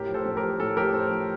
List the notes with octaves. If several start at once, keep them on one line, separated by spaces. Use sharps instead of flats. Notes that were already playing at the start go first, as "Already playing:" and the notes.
Already playing: A2 G4 A#4
F3
A4 C5
A2
G4 A#4
F3
A2 A4
F3 G4 A#4
A2 A4 C5
F3